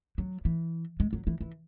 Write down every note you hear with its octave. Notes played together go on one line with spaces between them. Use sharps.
F#3
E3
G#3
F#3
E3
E3